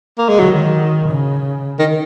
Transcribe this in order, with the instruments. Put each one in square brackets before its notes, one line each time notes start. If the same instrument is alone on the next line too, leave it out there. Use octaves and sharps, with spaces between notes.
[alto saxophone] A#3
G#3
[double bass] D#3 [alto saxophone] F#3
[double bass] C#3
[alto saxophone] D#3